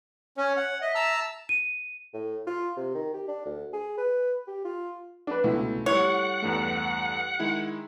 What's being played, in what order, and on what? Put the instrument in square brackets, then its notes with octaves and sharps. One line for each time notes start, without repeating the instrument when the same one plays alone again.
[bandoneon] C#4 [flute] C#5
[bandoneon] F#5
[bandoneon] D#5 [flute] E5
[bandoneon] A5 A#5 E6
[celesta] D#7
[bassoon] A2
F4
C3
D#3
G4
D4
D2
G#4
B4
G4
F4
[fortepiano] D4 B4
[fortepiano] C#2 E4 [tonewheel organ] B2 [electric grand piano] A3
[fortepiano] G3 E4 [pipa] C#5 [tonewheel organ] F#5
[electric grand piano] E2 G2 A3
D#3 G#3 E4